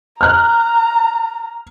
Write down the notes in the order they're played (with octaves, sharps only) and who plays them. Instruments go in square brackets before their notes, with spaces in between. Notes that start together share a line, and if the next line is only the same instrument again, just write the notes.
[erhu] A#5 [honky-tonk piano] F6 F#6